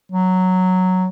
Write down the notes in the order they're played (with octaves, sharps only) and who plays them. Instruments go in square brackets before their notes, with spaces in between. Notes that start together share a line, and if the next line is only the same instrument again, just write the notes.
[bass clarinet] F#3